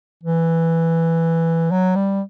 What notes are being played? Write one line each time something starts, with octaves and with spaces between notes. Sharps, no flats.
E3
F#3
G3